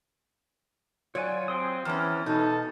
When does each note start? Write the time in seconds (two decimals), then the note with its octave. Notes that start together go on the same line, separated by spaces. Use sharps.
1.15 F#3 F4 C#5 D5 G#5
1.48 C4 G5 C6 D#6
1.85 E2 E3 B3 C#4 F6
2.26 B2 D#4 A4